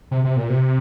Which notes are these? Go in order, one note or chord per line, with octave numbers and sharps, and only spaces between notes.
C3
C3
A#2
C3